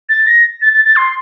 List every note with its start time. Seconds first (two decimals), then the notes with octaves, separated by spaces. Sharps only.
0.09 A6
0.27 A#6
0.62 A6
0.73 A6
0.85 A6
0.96 C6